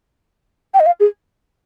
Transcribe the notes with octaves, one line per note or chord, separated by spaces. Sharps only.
G5
D#5
F5
G#4